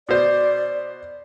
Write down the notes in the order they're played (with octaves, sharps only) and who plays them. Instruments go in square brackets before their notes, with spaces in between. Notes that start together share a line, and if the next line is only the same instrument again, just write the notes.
[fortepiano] B2 C5 [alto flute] D5